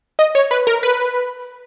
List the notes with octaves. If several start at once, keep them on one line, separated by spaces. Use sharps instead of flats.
D#5
C#5
B4
A#4
B4